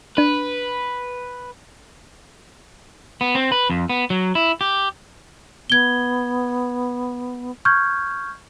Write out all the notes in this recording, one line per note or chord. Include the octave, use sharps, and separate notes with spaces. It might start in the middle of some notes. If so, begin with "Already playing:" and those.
D4 B4
B3
C4
B4
F2
B3
F#3
E4
G4
B3 G#6 G7
C#6 F6 G6 G#6